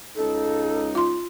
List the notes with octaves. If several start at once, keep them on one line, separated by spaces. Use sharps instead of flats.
C#2 D#4 A4
F4 C6